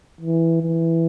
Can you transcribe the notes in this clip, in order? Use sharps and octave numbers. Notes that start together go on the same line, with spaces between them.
E3
E3